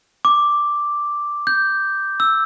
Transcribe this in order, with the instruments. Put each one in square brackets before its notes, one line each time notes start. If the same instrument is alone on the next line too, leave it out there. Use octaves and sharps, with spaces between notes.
[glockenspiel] D6
G6
E6